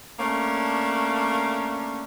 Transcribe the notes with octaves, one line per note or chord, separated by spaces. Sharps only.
A3 A#3 C#4 D4